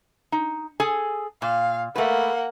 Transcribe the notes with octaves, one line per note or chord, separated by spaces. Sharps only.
D#4
G#4 A4 G#5
A#2 F5
A3 A#3 B4 F#5